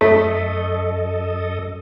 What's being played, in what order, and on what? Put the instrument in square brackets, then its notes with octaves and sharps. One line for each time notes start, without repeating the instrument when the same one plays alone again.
[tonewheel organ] F#2 A4 D#5 [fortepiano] A3